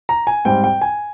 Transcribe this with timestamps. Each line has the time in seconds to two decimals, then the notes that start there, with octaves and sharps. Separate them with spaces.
0.09 A#5
0.27 G#5
0.45 G#2 G3 C4 G5
0.64 G5
0.81 G#5